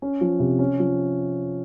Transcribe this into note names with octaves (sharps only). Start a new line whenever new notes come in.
C#4
F3
C3
C#4
F3